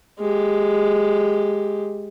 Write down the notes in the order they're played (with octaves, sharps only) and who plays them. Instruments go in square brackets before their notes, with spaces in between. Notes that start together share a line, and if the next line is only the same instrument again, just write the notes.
[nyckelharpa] G#3 G4